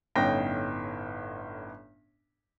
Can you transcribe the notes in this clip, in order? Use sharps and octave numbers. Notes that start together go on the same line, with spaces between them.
G1 A2 C#4 D#4 G5 A#6